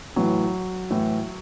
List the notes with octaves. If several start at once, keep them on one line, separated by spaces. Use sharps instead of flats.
A2 E3 F#3
A2 E3